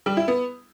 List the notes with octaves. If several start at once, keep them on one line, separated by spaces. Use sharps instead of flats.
G3
E4
B3